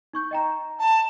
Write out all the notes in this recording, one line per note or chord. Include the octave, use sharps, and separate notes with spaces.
D#4 C#6 G6
D#5 G5 A#5
A5